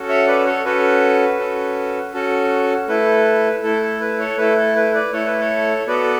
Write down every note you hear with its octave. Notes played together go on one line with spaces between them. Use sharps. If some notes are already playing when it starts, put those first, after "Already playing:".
Already playing: C#4 F#4 A4
C#5 E5
B4 D5
A4 C#5
C#4 F#4 A4 B4
C#4 F#4 A4
C#4 F#4 A4
A3 E4 A4 B4
A3 E4 A4
A4
B4
A4 C#5
A3 E4 A4 B4
A4
B4
B4 D5
A3 E4 A4 C#5
B4
A4 C#5
B3 F#4 A4 B4 D5